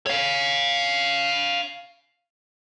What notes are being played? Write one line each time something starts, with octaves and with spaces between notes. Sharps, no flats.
C#5 F5